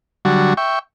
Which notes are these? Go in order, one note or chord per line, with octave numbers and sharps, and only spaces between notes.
D3 F#3 G3 F#4
E5 G5 C#6